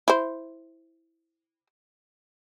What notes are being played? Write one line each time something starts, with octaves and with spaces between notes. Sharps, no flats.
E4 C5